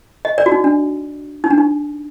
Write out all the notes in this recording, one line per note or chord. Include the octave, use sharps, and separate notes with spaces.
D#5
D5
F#4
D#4
D4
D#4
D4
D#4